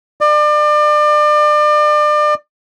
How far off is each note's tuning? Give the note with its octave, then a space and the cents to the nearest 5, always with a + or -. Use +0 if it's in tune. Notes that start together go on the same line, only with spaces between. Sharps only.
D5 +35